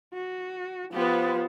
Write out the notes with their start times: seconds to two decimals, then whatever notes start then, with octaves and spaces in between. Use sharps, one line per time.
0.14 F#4
0.93 F3 B3 G4 B4 C5